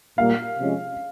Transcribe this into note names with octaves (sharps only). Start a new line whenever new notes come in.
A#2 G3 A#3 F5
C3 F3 G#3 C#4